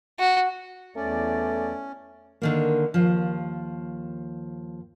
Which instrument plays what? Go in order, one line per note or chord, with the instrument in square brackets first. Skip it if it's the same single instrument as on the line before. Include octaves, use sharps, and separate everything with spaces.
[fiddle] F#4
[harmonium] E2 D5 [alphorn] A3 [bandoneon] C#4
[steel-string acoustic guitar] D3 D#3 A#3
D#2 F3